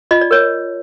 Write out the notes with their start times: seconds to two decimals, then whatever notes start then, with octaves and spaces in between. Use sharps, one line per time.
0.11 F4 D#5
0.21 D5
0.31 A#4 C#5